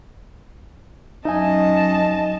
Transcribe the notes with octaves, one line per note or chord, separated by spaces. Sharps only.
F#2 D#4 D#5 E5 G#5 A5